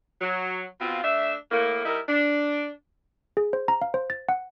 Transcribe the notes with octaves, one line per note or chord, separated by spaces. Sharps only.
F#3
B2 C4 F4
A3 D4 E5
A2 A#3
G3 D#4 E4 A#4
D4
G#4
C5
A#5
F5
C5
A6
F#5